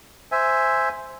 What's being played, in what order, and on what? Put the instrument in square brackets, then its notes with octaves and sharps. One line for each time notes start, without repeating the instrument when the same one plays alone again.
[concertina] C5 E5 G#5